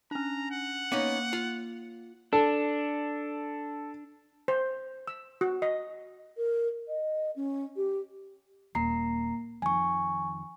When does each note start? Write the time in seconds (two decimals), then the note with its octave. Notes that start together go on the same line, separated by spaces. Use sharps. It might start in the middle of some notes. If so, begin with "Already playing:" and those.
0.11 C#4 D4 A#5
0.51 F#5
0.92 A#3 B3 C#4 D#4
1.33 F4
2.33 D4 A4
4.48 C5
5.07 E6
5.41 F#4
5.62 D#5
6.37 A#4
6.88 D#5
7.36 C#4
7.76 G4
8.75 D#1 A#3 A#5 C7
9.62 F2 D#3 G#5 C#6